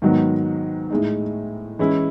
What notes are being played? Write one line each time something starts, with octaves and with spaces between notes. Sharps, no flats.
G#2 D#3 F#3 B3
A2 G#3 D#4
E3 G#3 C#4 E4